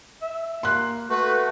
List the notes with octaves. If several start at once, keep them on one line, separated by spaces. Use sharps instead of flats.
E5
A#3 C6 F#6
A3 F#4 A4 B4